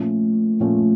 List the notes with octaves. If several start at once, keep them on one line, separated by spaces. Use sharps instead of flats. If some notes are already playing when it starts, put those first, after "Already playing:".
Already playing: A#2 F3 A3 C#4 F4
A#2 F3 A3 C#4 F4